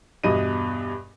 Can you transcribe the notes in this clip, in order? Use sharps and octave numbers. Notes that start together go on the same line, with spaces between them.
E2 G2 B2 D#5 D#7